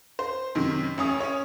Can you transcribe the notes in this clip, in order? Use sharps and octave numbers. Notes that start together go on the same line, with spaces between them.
C5
F#2 C3 D#3
A1 C#4 D#6
C#4 C#5